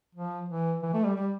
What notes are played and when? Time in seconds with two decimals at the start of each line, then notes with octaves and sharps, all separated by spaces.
0.15 F3
0.49 E3
0.82 E3
0.94 A3
1.04 G3
1.16 G3